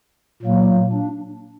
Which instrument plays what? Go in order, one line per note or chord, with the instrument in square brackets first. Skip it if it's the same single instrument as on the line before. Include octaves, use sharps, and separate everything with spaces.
[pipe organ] A#2 F#3 A#3
D4